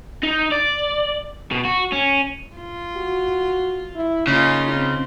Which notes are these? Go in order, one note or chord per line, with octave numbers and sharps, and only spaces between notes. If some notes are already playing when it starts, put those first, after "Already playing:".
D#4
D5
B2
F#4
C#4
F4
F#4
E4
C#3 A#3 C#4 D#4 F4
C4